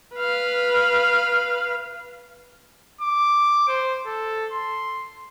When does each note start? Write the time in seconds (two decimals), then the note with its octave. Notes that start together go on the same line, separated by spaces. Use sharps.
0.16 B4 F5
3.01 D6
3.68 C5
4.06 A4
4.52 C6